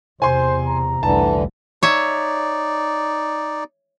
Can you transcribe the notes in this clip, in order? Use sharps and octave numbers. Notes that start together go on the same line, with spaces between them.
E2 C3 C5 G#5 C6
A#5
F1 C2 D3 E3 A5
D#4 C#5 D5 E5